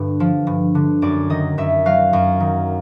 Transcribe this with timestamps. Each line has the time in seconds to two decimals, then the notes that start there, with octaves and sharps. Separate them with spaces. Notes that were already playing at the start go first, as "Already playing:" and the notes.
Already playing: G2 D3
0.20 F3
0.47 G2
0.75 D3
1.02 F#2 D5
1.30 D#3 D#5
1.58 F#2 E5
1.85 F#3 F5
2.13 F#2
2.40 D#3